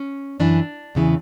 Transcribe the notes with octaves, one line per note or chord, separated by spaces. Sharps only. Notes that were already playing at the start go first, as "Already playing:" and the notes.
Already playing: C#4
F#2 E3 D4
E2 C#3 E3